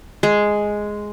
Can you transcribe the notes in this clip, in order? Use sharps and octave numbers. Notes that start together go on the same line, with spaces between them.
G#3